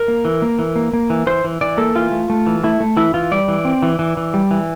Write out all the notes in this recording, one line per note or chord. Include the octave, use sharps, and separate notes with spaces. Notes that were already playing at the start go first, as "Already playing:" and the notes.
Already playing: A#4
A#3
E3
A#3
E3
A#3
A#3
E3
E3 C5
E3
E3 D5
A#3 A4
E3 F4
A3
A3
E3
A3 E4
A3
E3 E4
E3 F4
G3 D5
E3
C4
E3
E3
E3
G3
E3